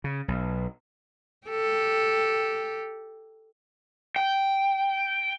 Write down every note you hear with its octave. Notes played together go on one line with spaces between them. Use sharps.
C#3
B1
G4 A4
G5